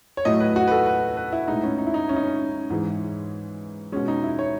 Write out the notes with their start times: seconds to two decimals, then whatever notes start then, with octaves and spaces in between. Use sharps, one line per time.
0.17 C#5
0.25 A2 F#3 A3 D#5
0.40 B4
0.56 F#4
0.68 B4
0.71 A4
0.86 B4
1.17 B4
1.33 E4
1.48 A2 G#3 D#4
1.63 C#4
1.78 D#4
1.87 E4
1.94 D#4
2.09 C#4
2.16 D#4
2.23 C#4
2.70 G#2 E3 G#3
3.92 B2 G#3 C#4
4.08 D#4
4.23 E4
4.39 C#5